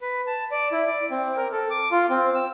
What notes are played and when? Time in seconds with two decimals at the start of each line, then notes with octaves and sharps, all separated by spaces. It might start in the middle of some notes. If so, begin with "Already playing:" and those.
0.01 B4
0.27 A5
0.51 D5
0.72 E4
0.87 D5
1.11 C4
1.37 A#4
1.52 A4
1.70 D6
1.91 F4
2.10 C4
2.35 E6